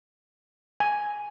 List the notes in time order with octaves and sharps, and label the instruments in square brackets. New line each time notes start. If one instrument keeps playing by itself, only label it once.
[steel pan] G#5